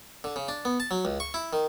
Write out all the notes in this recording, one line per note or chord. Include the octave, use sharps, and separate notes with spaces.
D3
C#3
D4
B3
A5
F#3
C#2
C#6
E4
D#3